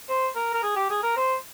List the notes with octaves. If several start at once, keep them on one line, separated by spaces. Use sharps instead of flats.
C5
A#4
A#4
G#4
G4
G#4
A#4
C5